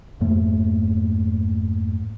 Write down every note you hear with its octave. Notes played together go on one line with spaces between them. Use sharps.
F2 G#2 A3 A#3